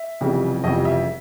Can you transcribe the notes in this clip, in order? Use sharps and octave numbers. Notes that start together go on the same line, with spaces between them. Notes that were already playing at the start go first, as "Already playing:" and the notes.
Already playing: E5
F1 F2 C#3 E3 G3
F1 F2 C#3 E3 G3 D#5
E5